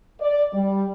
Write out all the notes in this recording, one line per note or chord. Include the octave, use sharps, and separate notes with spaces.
D5
G3